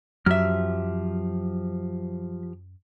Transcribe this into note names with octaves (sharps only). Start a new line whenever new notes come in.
F#2 F3 F#3 G4 E5 F6